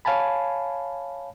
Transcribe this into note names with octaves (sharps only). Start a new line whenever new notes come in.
C#5 F5 G#5 A5 B5